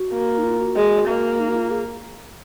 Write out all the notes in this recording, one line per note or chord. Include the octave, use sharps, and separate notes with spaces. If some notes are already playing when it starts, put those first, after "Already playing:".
Already playing: F#4
A#3
D#4
F4
F#4
G#3
A#3
D#4
F#4
F4
G#4